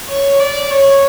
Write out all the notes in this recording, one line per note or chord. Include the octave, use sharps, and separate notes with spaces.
C#5
D5
C#5